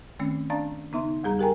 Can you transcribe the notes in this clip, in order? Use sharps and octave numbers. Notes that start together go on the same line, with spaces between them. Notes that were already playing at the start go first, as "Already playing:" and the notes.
D#3 A3 C4 C#4
D4 D5 F5 A5 A#5 A6
C#3 B3 D#4 E5 C6
E2 G3 G#4 A#5
G4 A#4 G5 G#5 A#5